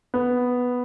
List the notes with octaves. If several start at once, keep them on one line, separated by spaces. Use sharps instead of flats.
B3